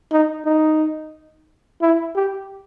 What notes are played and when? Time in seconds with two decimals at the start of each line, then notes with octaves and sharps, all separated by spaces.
0.12 D#4
0.45 D#4
1.82 E4
2.16 G4